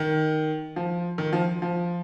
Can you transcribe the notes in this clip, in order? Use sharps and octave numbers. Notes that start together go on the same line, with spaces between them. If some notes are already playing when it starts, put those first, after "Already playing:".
Already playing: D#3
F3
D#3
F3
F3